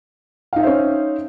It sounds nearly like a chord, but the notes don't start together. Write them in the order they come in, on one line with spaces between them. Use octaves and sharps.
F5 D#4 E5 C5 C#4